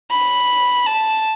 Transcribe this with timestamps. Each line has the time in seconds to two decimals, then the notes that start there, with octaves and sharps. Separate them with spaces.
0.11 B5
0.87 A5